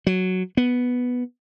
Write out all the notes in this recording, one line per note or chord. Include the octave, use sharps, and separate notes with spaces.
F#3
B3